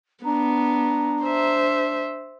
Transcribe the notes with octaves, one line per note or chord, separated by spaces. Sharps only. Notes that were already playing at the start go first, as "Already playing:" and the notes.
B3 D4 A#5
C5 E5